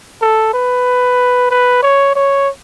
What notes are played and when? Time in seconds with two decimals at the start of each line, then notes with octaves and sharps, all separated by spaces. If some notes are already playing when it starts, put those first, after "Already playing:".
0.22 A4
0.54 B4
1.50 B4
1.83 C#5
2.15 C#5